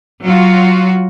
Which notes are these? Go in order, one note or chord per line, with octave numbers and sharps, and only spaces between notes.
F#3 F4 F#4